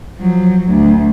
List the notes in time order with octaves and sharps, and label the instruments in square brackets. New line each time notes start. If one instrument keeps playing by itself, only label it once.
[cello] F3 F#3
D2